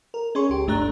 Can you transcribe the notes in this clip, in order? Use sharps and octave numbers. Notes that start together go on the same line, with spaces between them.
A#4
C#4 G#4 C#5 C6 C#6
C#2 G4
G1 G2 A3 D4 A#5 F#6